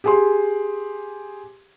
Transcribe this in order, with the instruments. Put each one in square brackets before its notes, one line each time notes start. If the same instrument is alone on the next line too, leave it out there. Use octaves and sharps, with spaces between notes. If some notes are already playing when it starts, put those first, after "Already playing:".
[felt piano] G4 G#4 C6